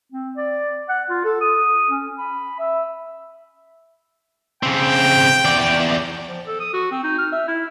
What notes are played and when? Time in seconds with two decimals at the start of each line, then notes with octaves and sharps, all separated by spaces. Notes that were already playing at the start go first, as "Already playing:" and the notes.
0.12 C4
0.37 D5
0.89 F#5
1.10 F4
1.24 A4
1.41 D#6
1.90 C#4
2.18 B5
2.59 E5
4.63 C#3 C4 G5
5.45 E2 D5
6.28 F3
6.47 A4
6.60 D#6
6.73 F#4
6.91 C4
7.04 D#4
7.18 F6
7.32 E5
7.48 E4